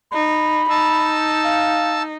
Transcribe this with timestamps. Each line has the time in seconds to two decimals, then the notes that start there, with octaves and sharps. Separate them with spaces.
0.13 D#4 B5
0.70 D#4 A5 E6
1.45 F5